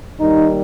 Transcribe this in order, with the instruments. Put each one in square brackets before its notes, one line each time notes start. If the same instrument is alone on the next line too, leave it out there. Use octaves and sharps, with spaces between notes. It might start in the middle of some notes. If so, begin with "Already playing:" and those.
[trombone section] D#2 D#3 G3 D#4